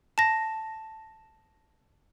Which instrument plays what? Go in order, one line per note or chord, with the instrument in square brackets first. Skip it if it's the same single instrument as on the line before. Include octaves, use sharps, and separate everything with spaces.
[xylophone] A5 A#6